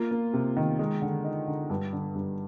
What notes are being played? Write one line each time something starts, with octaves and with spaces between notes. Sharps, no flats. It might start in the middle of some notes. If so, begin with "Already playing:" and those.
Already playing: A#3 F4
A#3
C3
D#3
G#3
D3
D#4
D3
G2
D3
G2